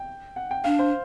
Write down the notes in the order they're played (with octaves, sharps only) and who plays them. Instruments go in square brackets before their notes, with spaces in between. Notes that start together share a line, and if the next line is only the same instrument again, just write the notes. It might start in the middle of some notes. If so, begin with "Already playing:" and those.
Already playing: [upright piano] G5
F#5
G5
[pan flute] D4 [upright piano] F5
[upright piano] C5